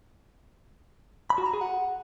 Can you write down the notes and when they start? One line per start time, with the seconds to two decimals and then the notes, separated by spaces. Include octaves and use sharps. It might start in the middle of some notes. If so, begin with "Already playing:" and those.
1.30 B5
1.38 F#4
1.46 A#5
1.53 G#4
1.61 F#5